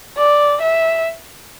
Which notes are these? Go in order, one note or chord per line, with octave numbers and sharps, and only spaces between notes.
D5
E5